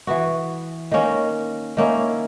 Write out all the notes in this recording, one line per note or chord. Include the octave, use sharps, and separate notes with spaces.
E3 B3 F#4
D#3 A#3 C#4
D#3 A#3 C#4 E4